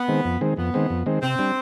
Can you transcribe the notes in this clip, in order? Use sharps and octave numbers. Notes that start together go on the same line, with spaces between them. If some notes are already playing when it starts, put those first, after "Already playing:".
Already playing: B3
D#3 G#3 C4
F2
D#3 G#3 C4
F2 B3
D#3 G#3 C4
F2
D#3 G#3 C4
C3 C4
G3 D4